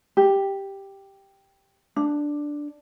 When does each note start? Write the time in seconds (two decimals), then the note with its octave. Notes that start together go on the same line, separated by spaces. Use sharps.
0.17 G4
1.96 D4